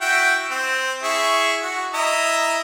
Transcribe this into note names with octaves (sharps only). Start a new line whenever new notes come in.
E4 F#4 G5
C4
E4 G#4 C#6
F#4
E4 D#5 A#5